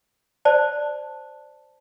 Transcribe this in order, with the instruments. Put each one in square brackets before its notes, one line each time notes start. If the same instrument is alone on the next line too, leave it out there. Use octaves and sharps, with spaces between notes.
[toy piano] C5 D5 A5